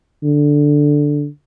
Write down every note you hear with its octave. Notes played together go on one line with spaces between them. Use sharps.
D3